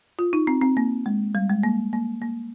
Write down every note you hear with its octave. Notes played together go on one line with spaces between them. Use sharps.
F4
D#4
C4
C4
A#3
G#3
G3
G#3
A#3
A#3
A#3